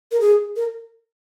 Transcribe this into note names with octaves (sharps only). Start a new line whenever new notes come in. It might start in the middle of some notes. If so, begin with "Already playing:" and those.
A#4
G#4
A#4